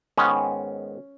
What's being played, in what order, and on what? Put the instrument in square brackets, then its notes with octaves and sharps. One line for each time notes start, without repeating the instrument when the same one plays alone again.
[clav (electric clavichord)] G#2 D#3 G#3 B3 C#4